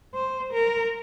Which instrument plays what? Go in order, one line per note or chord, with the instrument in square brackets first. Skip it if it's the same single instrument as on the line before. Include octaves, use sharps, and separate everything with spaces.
[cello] C5
A#4